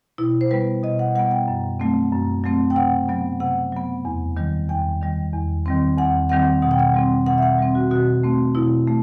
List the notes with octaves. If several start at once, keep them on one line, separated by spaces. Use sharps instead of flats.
B2 E4
C5
G3 B3 B4
B2 D#5
F#5
G3 B3 F#5
G5
F#2
F#3 A3 C4
F#2
F#3 A3 C4
G5
C3 F#5
F#3 B3
C3 F#5
F#3 B3
E2
D#3 G3
E2 G5
D#3 G3
E2
D#3 G3 C4
E2 F#5
D#3 G3 C4 F#5
B2 F#5
G5
F#5
G3 C4
B2 F#5
E5
F#5
G3 C4
F#4
B2 F#4
A3 C4
B2 E4
A3